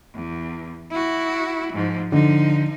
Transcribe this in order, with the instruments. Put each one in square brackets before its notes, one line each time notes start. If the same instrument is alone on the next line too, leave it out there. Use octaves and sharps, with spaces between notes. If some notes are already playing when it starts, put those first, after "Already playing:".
[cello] E2
E4 F#4
G#2 F3
[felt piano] D3 [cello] F3 D#4